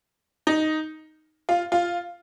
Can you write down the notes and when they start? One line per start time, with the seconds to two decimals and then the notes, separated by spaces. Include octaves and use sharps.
0.47 D#4
1.49 F4
1.72 F4